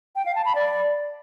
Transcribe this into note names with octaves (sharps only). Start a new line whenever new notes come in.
G5
F5
A5
B5
D5